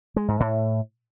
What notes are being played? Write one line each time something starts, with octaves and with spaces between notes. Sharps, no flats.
G#3
G#2
A2